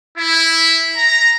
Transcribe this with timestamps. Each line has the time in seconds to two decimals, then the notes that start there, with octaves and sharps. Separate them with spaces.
0.17 E4
0.95 A#5